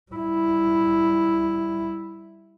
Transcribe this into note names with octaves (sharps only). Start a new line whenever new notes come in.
G3 E4